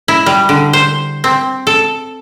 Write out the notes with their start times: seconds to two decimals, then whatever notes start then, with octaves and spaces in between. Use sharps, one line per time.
0.08 E4
0.26 G3
0.49 D3
0.73 C5
1.24 C4
1.67 A4